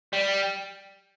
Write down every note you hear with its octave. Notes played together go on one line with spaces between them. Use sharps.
G3